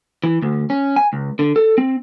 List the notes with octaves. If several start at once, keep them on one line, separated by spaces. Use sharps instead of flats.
E3
D2
C#4
G#5
C#2
D3
A4
C4